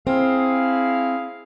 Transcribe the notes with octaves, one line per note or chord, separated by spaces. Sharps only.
C4 E4 G#4 F5